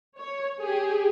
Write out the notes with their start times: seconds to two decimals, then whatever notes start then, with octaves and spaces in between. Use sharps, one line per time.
0.18 C#5
0.60 G4 G#4